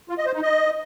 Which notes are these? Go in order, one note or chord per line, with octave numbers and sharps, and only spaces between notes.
F4
D#5
C5
D#4
D#5